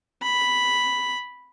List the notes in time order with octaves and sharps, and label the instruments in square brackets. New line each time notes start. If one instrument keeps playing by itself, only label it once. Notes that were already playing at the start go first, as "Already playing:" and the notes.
[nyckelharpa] B5